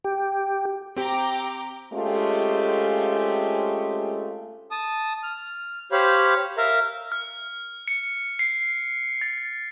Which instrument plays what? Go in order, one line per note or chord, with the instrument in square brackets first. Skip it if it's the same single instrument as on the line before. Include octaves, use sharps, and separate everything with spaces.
[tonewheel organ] G4
[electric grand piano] C4 G4 [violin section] G5 A#5 D6
[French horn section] G#3 A3 C4 C#4 F4 G4
[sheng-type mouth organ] A5 D#6
F6
G4 C5 C#5 F5 B5
A#4 E5 F5 A#5
[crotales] F6
C#7
C7
A6